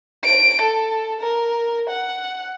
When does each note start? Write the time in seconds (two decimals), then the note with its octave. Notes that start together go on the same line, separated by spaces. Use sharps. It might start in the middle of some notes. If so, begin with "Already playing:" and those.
0.24 D7
0.62 A4
1.20 A#4
1.90 F#5